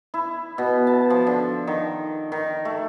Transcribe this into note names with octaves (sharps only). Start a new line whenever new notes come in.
E4
B2
A5
F3
D3
D#3
D#3
A3